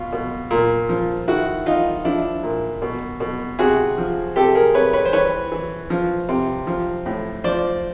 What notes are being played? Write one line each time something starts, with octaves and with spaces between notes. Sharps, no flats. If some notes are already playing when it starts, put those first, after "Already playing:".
Already playing: B2 F4
B2
A#2
F3
D#3 E4 F#4
D#3 D#4 F4
F3 D4 E4
A#2
B2
B2
C3 F#4 G#4
F3
C3 G4 A4
G#4 A#4
C3 B4 C#5
B4 C#5
C5
E3 B4 C#5
E3
F3
C3
F3
A2
F3 C5 D5